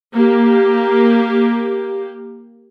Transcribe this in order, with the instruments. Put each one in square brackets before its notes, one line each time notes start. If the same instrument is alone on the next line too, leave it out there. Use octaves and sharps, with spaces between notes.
[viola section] A#3 G4